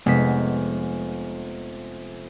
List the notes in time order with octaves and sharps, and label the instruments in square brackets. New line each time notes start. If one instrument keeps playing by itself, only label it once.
[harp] F1 B6 [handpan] G#3 B3